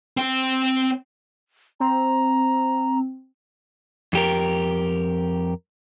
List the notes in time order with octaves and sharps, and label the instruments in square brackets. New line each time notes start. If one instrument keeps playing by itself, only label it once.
[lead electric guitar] C4 G5
[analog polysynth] C4 [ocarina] A#5
[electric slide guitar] F2 G4 A#4